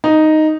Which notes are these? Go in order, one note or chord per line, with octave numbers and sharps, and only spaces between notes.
D#4